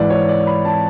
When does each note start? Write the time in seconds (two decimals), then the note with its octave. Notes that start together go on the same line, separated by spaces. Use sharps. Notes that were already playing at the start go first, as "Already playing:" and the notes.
Already playing: G#2 E3 D5
0.10 C#5
0.29 D5
0.47 B5
0.65 A5